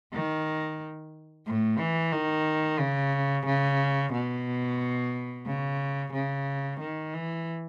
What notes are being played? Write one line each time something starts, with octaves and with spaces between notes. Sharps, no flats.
D#3
A2
E3
D#3
C#3
C#3
B2
C#3
C#3
D#3
E3